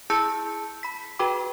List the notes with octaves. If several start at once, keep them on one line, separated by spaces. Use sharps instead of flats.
E4 G#4 A5 E6 G6 C#7
B5 B6
F#4 G#4 B4 G5 B5 D6